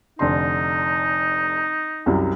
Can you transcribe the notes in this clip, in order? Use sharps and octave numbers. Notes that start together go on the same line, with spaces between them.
F1 D3 D#4 C6
C2 F#2 C3